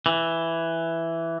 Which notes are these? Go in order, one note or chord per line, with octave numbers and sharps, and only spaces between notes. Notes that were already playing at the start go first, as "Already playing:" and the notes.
E3